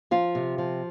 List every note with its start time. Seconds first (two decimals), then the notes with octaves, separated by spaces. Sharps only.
0.11 F3 F4
0.35 C3
0.58 F3